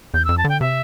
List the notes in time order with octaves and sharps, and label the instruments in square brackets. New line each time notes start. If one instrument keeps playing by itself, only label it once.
[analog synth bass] E2 [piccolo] G6
[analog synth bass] F2 [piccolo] E6
[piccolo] A5
[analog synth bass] D3 [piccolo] G5
[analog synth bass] C3 [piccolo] E5